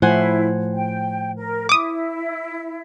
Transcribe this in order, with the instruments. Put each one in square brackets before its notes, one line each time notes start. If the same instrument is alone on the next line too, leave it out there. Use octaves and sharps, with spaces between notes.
[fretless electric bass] A2 F3 [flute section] E4 [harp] C5 F#5 G#5
[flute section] G5
A#4
[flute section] E4 [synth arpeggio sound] D6 D#6